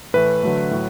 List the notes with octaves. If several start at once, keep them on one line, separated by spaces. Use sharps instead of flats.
A2 E3 A3 B4
D3 F#3 A3
A2 F#3